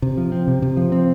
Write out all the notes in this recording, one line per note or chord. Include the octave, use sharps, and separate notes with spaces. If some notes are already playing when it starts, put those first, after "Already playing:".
C3
F3
C4
C3
C3
F3
C4